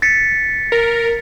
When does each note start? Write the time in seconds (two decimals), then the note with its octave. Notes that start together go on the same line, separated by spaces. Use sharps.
0.02 A6 B6 C#7
0.72 A#4